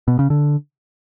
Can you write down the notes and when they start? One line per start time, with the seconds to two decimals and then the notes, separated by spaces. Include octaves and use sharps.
0.08 B2
0.19 C#3
0.30 D3